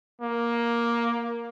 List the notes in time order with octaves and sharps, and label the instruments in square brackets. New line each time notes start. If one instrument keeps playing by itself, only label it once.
[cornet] A#3